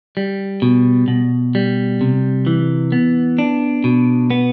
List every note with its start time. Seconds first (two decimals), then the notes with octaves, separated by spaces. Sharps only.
0.17 G3
0.62 B2
1.08 B2
1.55 G3
2.01 C3
2.47 E3
2.92 B3
3.39 D4
3.84 B2
4.30 B3